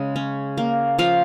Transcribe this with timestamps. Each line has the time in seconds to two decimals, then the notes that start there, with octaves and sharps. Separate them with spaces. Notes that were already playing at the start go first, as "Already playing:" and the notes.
Already playing: C#3 G#3
0.16 C#4
0.58 A#3
0.99 F3 F5